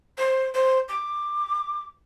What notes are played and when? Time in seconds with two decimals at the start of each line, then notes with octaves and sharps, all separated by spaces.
0.17 C5
0.54 C5
0.88 D6